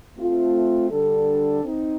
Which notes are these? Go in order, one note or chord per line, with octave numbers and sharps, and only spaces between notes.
A3 C4 F4
D3 G3 D4 A4
C4 D#4